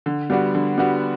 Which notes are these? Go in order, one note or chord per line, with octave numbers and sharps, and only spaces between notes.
D3
G3 B3 D4 F#4
D3
G3 B3 D4 F#4